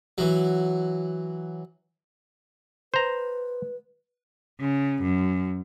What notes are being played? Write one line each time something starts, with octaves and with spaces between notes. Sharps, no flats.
E3 F#3
B4 C5 A#5
C#3
F#2